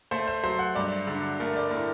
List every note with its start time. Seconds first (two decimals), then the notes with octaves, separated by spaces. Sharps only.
0.11 A3 C5
0.28 C5
0.43 F#3 C5
0.59 F#5
0.75 G2 D5
1.07 D3
1.40 A3 A#4
1.56 D5
1.71 A2 A#4